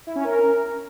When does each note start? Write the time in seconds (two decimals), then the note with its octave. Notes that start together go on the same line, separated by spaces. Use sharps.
0.07 E4
0.16 C#4
0.24 A#4